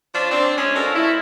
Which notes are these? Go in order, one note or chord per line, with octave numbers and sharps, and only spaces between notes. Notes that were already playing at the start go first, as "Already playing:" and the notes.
F3 C#4 D4
C4 D4
G#3 C#4
F3 D4 F#4 A4 A#4
A3 E4